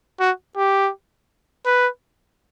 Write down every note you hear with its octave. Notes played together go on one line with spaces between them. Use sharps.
F#4
G4
B4